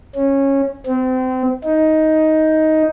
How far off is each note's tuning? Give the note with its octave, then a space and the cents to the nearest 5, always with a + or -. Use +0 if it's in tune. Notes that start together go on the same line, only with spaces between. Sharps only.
C#4 -15
C4 -30
D#4 +10